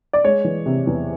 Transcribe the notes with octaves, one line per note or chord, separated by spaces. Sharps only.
D5
G#3 C#5
E3
C3
E2